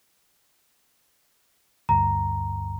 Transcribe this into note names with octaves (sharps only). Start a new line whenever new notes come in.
D2 G2 A#5